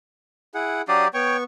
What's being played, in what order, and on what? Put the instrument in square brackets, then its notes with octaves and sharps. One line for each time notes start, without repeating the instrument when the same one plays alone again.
[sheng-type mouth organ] E4 G#4 F#5
[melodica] F#3 G4 D5 [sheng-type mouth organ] D4 F5 D#6
[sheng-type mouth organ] B3 C#6 [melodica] C#5 G5